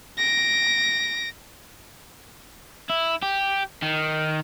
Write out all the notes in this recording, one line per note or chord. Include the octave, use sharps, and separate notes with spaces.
A#6 D7
E4
G4
D#3